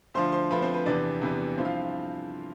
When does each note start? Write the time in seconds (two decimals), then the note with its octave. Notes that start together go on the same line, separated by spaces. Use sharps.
0.14 D2 D3 F3 C5 C6
0.32 C5 C6
0.51 D2 D3 F3 B4 B5
0.62 C4 C5
0.74 B4
0.85 E2 C3 E3 B3 D4 D5
1.22 E2 C3 E3 B3
1.57 G2 F3 C4 E4
1.65 F4 F5